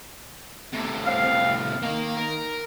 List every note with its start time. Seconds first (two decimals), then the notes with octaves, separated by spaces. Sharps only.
0.73 A2 C3
1.06 C4 F5
1.82 D#3 A#3 F5
2.17 A#4